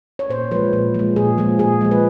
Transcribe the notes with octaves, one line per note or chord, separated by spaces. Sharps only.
C#5
A#2 C5
F3 G#3 B4
A#2
F3 G#3
A#2 G#4
F3 G#3
A#2 G#4
F3 G#3
B4